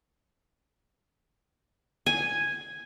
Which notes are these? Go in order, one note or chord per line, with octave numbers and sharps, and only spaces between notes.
G#5